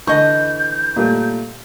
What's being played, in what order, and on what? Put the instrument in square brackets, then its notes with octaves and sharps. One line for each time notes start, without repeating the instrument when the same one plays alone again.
[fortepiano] D3 A5 C#6 [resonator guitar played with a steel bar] E3 D#5 [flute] G6
[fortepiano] A#2 G3 A3